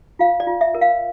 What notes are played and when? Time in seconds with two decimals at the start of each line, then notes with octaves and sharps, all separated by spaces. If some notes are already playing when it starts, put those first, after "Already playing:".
0.19 F4 F5
0.40 D5
0.47 F4
0.61 E5
0.74 A#4
0.81 F5